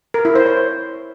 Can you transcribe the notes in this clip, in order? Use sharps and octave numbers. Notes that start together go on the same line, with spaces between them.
A#4
E4
C5
C#5